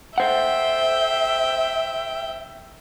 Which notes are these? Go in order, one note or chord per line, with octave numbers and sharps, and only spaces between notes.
A4 C5 E5 F#5 G5